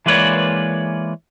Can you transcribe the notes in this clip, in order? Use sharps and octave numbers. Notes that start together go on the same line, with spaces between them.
E3 G#3 A#3 B4 C#5 D5